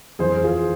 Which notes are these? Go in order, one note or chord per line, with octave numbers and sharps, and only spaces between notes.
F2 E3 G#4 C5
F4 G#4